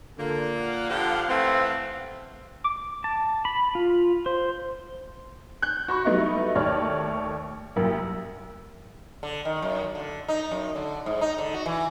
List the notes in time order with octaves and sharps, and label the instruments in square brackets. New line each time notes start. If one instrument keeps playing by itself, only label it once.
[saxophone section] A#2 A#3 [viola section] D3
[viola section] F5 F#5
[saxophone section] D3 F3 G4
[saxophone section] E3 A3 [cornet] C4
[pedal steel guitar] D6
A5
B5
F4
C5
[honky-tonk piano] F#6 G6
F#4 B5 C#6
F#3 G3 A3 B3 D#4 E4
D#2 A3 C#5 D5 A5 F6
C2 F#2 A#3
[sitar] D3
D#3
F#2
D3
D#4
F#2
D3
G#2
D#4
D3
F#4
E3